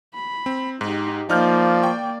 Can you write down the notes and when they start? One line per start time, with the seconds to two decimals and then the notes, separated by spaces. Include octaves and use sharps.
0.14 B5
0.46 C4
0.81 G#2 D#4 G4
1.30 F3 A#3 D#4 D5 F6 G6
1.82 G5 C#6